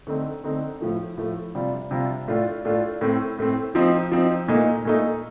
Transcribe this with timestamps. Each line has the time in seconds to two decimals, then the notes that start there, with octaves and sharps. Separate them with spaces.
0.07 D3 A3 C4 D#4
0.44 D3 A3 C4 D#4
0.81 A2 F3 A3
1.18 A2 F3 A3
1.55 C3 G3 D4 F4
1.91 C3 G3 D4 F4
2.28 A2 A3 D4 F4
2.65 A2 A3 D4 F4
3.01 A2 A3 C4
3.39 A2 A3 C4
3.75 F3 C4 D#4
4.12 F3 C4 D#4
4.48 A#2 A3 D#4
4.85 A#2 A3 D#4